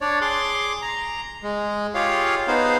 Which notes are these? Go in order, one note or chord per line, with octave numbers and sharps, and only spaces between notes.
D4 C#5 D5
G#4 C6 D6
A#5
G#3
F4 G4 G#4 C#5 F5
B3 D#4 G#4 C5 F5